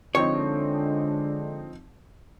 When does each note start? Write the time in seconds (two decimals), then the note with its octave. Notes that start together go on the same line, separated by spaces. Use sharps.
0.15 D3 F3 G#3 C4 D4 D#4 C#5